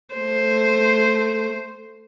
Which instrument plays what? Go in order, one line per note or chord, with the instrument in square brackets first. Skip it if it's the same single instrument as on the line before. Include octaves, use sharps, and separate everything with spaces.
[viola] A3 C5